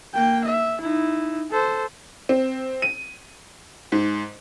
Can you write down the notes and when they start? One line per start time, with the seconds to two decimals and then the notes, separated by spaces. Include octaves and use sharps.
0.14 A#3 G5
0.45 E5
0.81 D#4 E4
1.51 A4 C5
2.29 C4
2.82 D#7
3.92 G#2